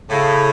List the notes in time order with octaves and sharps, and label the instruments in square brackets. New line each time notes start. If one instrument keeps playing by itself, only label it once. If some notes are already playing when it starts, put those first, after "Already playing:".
[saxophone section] A2 [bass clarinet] C#3